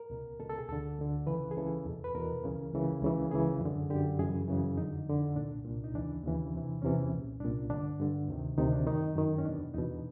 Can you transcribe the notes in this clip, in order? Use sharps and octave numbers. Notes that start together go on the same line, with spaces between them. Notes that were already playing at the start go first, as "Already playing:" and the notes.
Already playing: A#4
C#2 B2
C#2 B2 A4
A4
G#4
D2 D3 A4
D2 D3
C#2 C#3 E3 B4
G#4
C#2 C#3 E3 A4
E2 B2
B4
E2 B2 A#4
C#2 C#3 E3
C#2 C#3 E3
C#2 C#3 E3
C#2 C#3 E3 G#4
F#2 D3
F#2 D3 G4
F#2 C#3 E3 G#4
F#2 C#3 E3
F2 D3 D#4
F2 D3
C2 A#2 D4
C2 A#2
D#4
D#2 C#3 E3 D4
D#2 C#3 E3
E2 C3 E3
E2 C3 E3 C#4
C2 A#2
C2 A#2 D4
G2 D3 D4
G2 D3
D2 C3 D#3
D2 C3 D#3 D#4
D4
F#2 D#3 D#4
F#2 D#3
C#4
E2 B2 D4
E2 B2 D#4